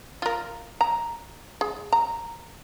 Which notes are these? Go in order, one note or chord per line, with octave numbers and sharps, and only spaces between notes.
F4 A#4
A#5
G#4
A#5